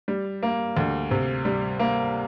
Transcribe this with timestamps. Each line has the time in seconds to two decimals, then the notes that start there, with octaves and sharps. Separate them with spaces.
0.08 G3
0.43 A#3
0.77 D2
1.11 C3
1.45 G3
1.79 A#3